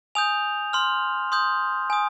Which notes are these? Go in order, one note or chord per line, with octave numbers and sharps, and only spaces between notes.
G#5 D#6 G6 F7
C6 F6
C6 D#6 G6
G#5 D#6